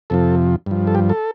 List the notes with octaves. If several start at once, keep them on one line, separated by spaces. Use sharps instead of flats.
F2 C3 F3 A4
G2 F3
A4
G4
A4